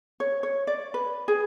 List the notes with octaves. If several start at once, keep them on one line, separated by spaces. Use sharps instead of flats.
C#5
C#5
D5
B4
G#4